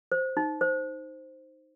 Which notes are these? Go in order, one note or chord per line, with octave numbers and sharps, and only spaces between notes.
C5
D#4
C5